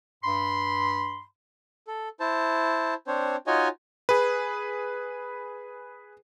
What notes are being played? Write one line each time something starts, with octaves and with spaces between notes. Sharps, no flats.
G2 B5 C6
A4
E4 C5 A5
C4 D4 C5 C#5
D#4 F4 F#4 C#5 D#5 G#5
G#4 B4